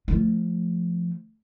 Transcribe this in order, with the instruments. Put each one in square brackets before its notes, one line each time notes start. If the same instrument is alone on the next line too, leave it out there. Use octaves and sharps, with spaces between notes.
[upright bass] F3 A3